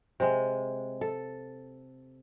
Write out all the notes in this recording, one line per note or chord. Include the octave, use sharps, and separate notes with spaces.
C3 G#3
A4